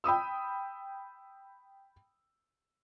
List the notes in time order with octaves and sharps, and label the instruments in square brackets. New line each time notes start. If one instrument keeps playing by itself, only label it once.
[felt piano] G5 B5 D#6 E6